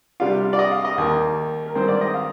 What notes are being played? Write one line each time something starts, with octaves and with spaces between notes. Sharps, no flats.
C3 G3 D4 F4 F5
D5
D#5
F5
D#5
D#2 D#3 A#3
A#4
G2 D#3 G#3 C4 C5
D5
D#5
F5